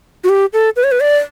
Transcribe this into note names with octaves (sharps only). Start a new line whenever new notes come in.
F#4
G4
A4
B4
C#5
B4
D5